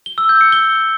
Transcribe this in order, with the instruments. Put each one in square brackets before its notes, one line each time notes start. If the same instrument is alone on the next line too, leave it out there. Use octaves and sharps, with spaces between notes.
[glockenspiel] G7
E6
G6
C#7
G7